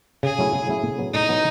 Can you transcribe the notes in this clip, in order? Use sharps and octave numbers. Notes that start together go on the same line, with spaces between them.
C#3 G#4
F#3 A3 C#4 E4
C#3
F#3 A3 C#4 E4
A2
F#3 B3
A2 D#4
F#3 B3